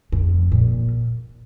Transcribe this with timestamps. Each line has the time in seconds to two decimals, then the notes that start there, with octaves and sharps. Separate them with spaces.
0.12 F2
0.52 A#2